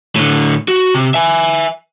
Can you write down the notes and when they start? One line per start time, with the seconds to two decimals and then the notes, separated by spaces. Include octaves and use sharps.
0.16 A2 D3
0.68 F#4
0.94 C3
1.14 E5 G#5